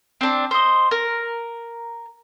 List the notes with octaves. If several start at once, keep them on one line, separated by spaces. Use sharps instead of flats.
C4 D4
C5 D#5
A#4